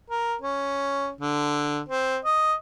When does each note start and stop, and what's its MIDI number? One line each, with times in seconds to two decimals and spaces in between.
0.10 0.35 70
0.42 1.10 61
1.21 1.79 50
1.89 2.18 60
2.25 2.53 75